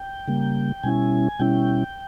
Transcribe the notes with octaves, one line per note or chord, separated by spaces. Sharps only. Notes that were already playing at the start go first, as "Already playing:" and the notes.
Already playing: G5
C#3 G3 A#3
B2 G3 C#4 E4 G#5
B2 G3 C#4 E4 G5